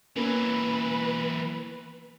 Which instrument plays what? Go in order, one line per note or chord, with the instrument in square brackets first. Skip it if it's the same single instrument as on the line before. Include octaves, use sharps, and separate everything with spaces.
[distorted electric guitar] E3 F#3 [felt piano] A#3 B3 C#4 [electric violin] B4